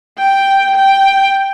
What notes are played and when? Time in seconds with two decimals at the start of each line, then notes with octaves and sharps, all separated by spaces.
0.19 G5
0.75 G5